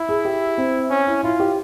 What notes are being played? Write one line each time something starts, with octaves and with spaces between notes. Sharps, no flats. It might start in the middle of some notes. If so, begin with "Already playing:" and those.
Already playing: E4
G#4
G4
C4
C#4
E4
E4 F4
G4